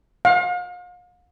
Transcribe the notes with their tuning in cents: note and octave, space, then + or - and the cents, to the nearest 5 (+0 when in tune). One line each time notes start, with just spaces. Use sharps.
F5 +40